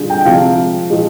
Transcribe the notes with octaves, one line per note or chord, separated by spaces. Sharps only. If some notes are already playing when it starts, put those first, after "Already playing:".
Already playing: D3 G3 F4 G4 G#4
G5
C3 F3 G#3 F5
F3 G#3